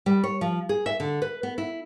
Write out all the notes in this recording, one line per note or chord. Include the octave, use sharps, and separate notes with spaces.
G3
C#5
F3
G#4
E5
D3
B4
B3
E4